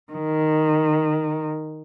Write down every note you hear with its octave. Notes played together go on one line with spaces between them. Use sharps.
D#3